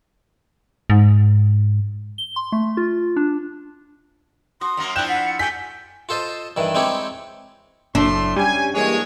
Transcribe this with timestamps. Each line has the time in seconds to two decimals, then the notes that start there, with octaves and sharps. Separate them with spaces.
0.90 G#2
2.18 G7
2.36 C6
2.52 A3
2.77 F4
3.16 D4
4.61 F#4 C6 D#6
4.77 F#2 F#3 A#3
4.96 F3 D4 E4 G5 F#6 G6 E7
5.08 F#5 B6
5.25 C#7
5.39 A3 F#4 G5 G#5 B6
6.09 F4 A4 C5 D#5
6.57 G2 D#3 E3
6.74 G#3 C4 D#4 E4 G4 C#5
7.95 F#1 A2 A3 D4 C6
8.36 G3 C#4 G4 G#5
8.74 G2 E3 G#3 A#3 C#5